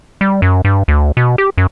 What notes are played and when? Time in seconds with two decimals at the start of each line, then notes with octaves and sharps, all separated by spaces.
0.21 G3
0.42 F#2
0.65 G2
0.88 D2
1.17 B2
1.38 G4
1.58 F#2